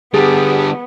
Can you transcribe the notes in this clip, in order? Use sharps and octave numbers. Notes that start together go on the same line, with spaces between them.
D3 G3 B3 G4 G#4